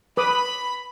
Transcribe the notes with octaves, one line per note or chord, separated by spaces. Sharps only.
B4 B5 D6 D#6